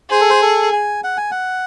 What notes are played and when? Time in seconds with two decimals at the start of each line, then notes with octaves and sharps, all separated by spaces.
0.11 G#4 C5
0.21 A4
0.30 C5
0.42 A4
0.73 G#5
1.04 F#5
1.17 G#5
1.31 F#5